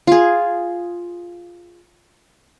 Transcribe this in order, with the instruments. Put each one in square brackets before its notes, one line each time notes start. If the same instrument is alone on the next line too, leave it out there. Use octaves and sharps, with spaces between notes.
[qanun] F4 G#4